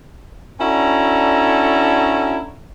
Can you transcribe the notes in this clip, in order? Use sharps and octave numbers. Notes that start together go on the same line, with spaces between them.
C#4 D4 E4 F#4 A4 A#5